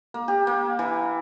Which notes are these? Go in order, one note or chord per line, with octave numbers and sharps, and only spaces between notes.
A#3
G4
A#3
E3